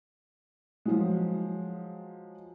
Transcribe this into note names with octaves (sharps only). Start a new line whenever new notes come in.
F3 F#3 G#3